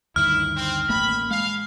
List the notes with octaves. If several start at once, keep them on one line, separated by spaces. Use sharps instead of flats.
D2 G2 D#3 E4 F6
C4
A1 A3 A#3 B5
G#3 F5